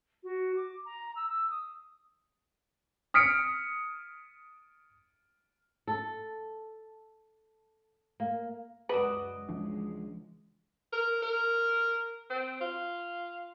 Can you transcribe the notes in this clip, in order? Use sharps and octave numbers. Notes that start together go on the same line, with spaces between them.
F#4
D6
A#5
E6
E6
D#6
D#6 F6 B6 C#7 D7
A4
A#3
C#2 F#2 F#4 B4 D5 D#5
C#2 E3 F3 G#3 D4
A#4
A#4
C4
F4